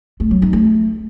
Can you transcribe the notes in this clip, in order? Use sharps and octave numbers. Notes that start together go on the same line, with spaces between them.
A3
F#3
D#4
A3